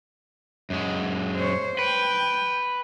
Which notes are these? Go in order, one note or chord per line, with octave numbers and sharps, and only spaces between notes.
F#2 G#3
C5 C#5
B4 G5